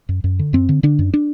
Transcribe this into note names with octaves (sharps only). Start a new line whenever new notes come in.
F#2
F#2
D3
F#2 C4
D3
D3 D4
F#2
D4